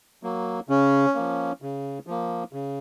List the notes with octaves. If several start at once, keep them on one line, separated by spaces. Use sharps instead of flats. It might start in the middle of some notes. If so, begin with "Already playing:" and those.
F#3 A#3
C#3 C#4
F3 A#3
C#3
F3 A#3
C#3